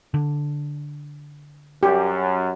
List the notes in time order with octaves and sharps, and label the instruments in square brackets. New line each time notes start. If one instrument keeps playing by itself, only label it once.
[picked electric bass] D3
[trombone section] F#2 [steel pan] G4